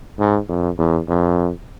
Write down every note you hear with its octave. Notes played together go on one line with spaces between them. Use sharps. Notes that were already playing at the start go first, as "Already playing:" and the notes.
G#2
F2
E2
F2